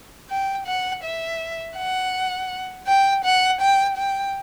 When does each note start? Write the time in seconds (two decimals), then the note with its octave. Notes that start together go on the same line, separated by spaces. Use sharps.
0.30 G5
0.67 F#5
1.04 E5
1.77 F#5
2.87 G5
3.25 F#5
3.61 G5
3.98 G5